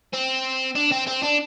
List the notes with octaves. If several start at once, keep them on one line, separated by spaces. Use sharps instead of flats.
C4
D4
C4
C4
D4